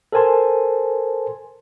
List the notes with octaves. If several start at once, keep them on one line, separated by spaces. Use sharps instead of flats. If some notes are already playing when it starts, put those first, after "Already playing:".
A4 A#4 C5 G#5 A5 C6